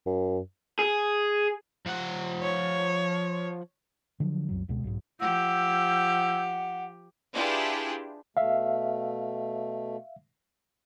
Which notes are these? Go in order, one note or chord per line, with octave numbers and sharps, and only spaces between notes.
F#2
G#4
F3 F#5
C#5
D3 F3 F#3
C2 F#2 F#3
C#2 B2 G#3
B1 G#2
F3 G4 F#5 E6 G6 G#6
D4 E4 F4 G4 G#4 B4
B2 A3 E5 F5